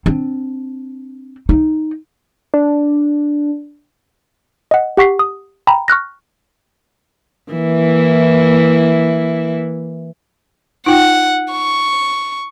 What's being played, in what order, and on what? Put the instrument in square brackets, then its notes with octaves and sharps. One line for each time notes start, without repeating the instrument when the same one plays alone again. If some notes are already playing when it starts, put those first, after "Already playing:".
[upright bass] C4 D4
D#4
[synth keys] D4
[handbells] D#5 F#5
G4 F#5 C#6 B6 C7
D#6
G5 A#5 B5
C#6 F6 F#6 A#6
[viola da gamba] E3 A#3 E4
[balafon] D#4 F4 G5 [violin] F#5
[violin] C#6